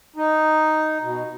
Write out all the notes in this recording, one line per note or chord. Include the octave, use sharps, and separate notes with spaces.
D#4
B2